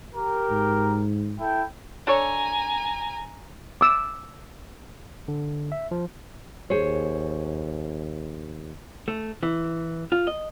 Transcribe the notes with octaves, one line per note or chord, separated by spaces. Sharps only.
G4 A#4
G#2
E4 A4 G5
D4 A4 C#5 G#5 A#5
D6 E6
D3
E5
F3
D#2 G#4 C5 C#5
A3
E3
F4
D#5